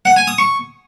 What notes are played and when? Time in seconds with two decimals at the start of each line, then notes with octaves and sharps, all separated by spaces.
0.05 F#5
0.16 G#5
0.27 D#6
0.38 C#6